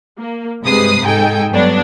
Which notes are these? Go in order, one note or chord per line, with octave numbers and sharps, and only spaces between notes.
A#3
G2 C3 G#3 B4 D#6 C7
G#2 D#4 A4 G5 G#5
G2 F#3 B3 D4